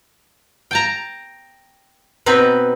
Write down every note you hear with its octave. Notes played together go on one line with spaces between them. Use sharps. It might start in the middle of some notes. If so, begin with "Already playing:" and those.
G5 A5 A#5
B2 C4 D#4 B4